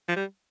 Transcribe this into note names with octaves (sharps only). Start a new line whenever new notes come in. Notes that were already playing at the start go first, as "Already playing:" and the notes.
F3
G3